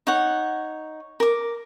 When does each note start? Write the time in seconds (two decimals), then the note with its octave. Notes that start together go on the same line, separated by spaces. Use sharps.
0.07 D#4 C#5 F#5
1.20 A#4 D6